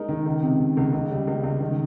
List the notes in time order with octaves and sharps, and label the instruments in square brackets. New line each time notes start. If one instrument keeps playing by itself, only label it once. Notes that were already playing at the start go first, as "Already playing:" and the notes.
Already playing: [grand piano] G#3 D#4 A#4
D#3
C#2
C3
C3
C#2
C#2
G3
C#2
C#2
D#3